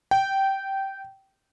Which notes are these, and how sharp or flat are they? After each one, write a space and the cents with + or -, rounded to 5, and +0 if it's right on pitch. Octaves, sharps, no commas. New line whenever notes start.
G5 -15